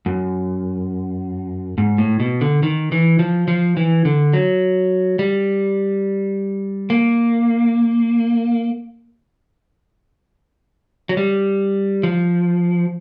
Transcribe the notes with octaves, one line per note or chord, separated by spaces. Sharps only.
F#2
G#2
A2
B2
D3
D#3
E3
F3
F3
E3
D3
F#3
G3
A#3
F#3
G3
F3